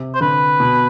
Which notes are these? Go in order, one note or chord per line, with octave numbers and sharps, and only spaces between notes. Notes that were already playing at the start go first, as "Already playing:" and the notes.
Already playing: C3
C5
D3 B4
B2